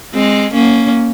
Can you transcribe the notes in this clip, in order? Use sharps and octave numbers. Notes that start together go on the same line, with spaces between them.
G#3 C4
A#3 C#4